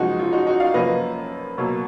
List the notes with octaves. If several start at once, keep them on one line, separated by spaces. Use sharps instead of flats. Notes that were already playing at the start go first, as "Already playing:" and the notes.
Already playing: F#2 F3 G#3 D#4 F#4
F4
D#4 F#4
D#4 F#4
D5 F5
F#2 F3 A#3 B4 D#5
B2 F#3 A#3